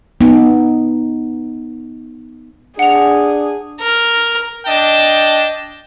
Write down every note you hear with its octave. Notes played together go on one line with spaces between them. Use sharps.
B3 D#4
D4 G#4 F#5 F7
A#4
D4 D#5 G5 A5